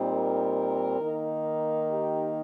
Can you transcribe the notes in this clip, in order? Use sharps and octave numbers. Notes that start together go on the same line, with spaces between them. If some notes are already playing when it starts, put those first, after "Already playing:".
Already playing: A#2 G3 C4 D#4
A#4
D#3 A#3 D#4
G4